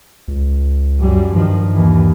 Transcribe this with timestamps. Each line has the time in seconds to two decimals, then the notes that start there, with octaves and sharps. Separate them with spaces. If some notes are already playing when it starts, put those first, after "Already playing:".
0.28 C#2
1.00 F#2 G3
1.35 G2 D#3 F3
1.72 D#2 E3